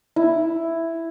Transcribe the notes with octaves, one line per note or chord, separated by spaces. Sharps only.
E4